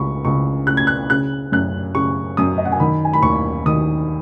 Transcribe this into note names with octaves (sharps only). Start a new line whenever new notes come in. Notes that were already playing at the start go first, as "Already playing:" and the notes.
Already playing: C#2 B5 C#6
C#2 C#6
C#3 F#6
G#6
F#6
C#3 F#6
F#2 F#6
C#3 C#6
F#2 D#6
D#5
F#5
G#5
D#3 B5
G#5
B5
D#2 C#6
D#3 D#6